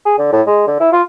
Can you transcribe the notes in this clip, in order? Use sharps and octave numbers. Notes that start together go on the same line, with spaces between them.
G#4
D3
A2
G#3
D3
E4
F4